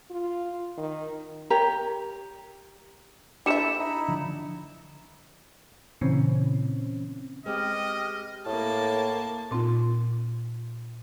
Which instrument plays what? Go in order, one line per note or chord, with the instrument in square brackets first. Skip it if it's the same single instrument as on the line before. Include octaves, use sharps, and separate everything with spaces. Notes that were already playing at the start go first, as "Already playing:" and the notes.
[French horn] F4
D#3
[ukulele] G4 A#4 C#5 A#5
[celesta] D4 C#7 E7 [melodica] E4 A4 [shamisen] G4 C5 E5
[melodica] D#4 E4
[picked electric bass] D3 F3 D4
[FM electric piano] A#2 C#3 E3 C4 C#4
[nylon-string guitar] G#3 B3 C4 [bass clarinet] G4 [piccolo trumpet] D#5 [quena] F6
[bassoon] A2 [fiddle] A#3 A5
[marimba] A#2 C4 D#4 F4